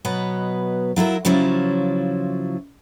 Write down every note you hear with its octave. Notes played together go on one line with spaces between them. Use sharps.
B2 F#3 B3 B4 D#5
F#3 E4 F4 A#4
C#3 F3 F#3 E4 F4